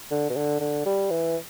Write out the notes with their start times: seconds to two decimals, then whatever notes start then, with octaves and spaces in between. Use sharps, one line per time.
0.11 D3
0.30 B2
0.36 D3
0.60 D3
0.86 G3
1.10 E3